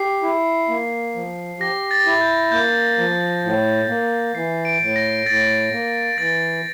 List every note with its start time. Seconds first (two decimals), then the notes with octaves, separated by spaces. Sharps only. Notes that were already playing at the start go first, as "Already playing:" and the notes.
Already playing: G4 C7
0.23 E4
0.69 A#3
1.15 F3
1.60 G4 A#6
1.91 A6
2.06 E4
2.21 G6
2.52 A#3 G6
2.98 F3
3.44 A2
3.89 A#3
4.35 E3 C7
4.65 D7
4.80 A2
4.96 A#6
5.26 A2 A6
5.72 A#3
6.18 E3 A6